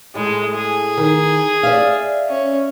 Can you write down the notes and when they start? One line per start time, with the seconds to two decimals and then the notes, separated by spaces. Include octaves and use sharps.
0.15 A2 G#3
0.55 G#4
0.97 D#3
1.63 D5 E5 F5
2.29 C#4